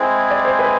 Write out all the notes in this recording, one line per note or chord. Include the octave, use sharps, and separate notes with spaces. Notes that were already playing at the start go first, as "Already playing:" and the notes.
Already playing: G#3 C4 E4 G#4 C5
D5
C5
B4